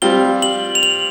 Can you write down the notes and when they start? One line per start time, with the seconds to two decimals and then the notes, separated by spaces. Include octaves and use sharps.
0.02 G3 C4 F4 G7
0.42 F#7
0.75 F7
0.83 F#7